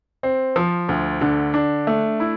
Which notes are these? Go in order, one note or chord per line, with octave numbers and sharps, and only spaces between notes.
C4
F3
D2
D3
D4
A3
E4